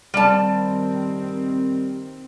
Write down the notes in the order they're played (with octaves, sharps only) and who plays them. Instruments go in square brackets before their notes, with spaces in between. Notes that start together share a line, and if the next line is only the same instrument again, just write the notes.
[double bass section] D#3 C4 [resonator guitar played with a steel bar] G3 A5